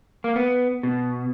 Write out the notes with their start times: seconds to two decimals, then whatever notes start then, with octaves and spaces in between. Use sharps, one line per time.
0.24 A#3
0.36 B3
0.83 B2